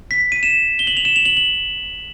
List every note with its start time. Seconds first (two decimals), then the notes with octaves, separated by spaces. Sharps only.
0.11 B6
0.32 D#7
0.43 E7
0.79 G7
0.87 F#7
0.97 F7
1.05 E7
1.16 F7
1.25 F#7
1.37 F#7